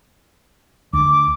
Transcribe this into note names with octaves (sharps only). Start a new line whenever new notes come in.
D2 D6